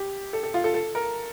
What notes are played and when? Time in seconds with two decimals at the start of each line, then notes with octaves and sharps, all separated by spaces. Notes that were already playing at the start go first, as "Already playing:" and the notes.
Already playing: G4
0.33 A4
0.43 A4
0.54 F4
0.64 A4
0.74 A4
0.95 A#4